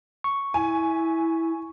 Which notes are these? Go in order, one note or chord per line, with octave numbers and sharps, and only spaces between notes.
C#6
E4 G#5